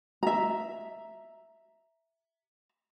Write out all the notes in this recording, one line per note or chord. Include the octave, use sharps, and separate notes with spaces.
E5 A#5